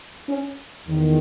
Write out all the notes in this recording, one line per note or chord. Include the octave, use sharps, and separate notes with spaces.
C#4
E2 D#3